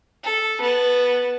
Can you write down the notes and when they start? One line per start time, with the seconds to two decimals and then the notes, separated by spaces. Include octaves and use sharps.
0.23 A4
0.61 B3 A5